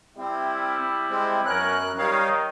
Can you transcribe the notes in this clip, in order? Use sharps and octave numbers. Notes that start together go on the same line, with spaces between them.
G3 C4 E4
G#3 C4
F#2 B2 C#4 A#4 F#6
D#3 G3 C#5 F5